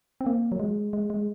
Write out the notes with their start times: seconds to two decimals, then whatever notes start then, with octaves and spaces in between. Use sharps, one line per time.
0.21 C4
0.26 A#3
0.52 F#3
0.60 G#3
0.93 G#3
1.10 G#3